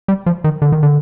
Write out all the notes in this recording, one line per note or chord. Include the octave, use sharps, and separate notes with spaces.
G3
F3
D#3
D3
D#3
D3